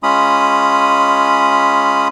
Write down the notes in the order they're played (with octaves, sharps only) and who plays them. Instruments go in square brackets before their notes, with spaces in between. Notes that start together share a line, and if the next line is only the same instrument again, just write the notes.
[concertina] G#3 C#4 F4 B5 D#6